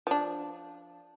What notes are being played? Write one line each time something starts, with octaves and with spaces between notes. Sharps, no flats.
F3 D4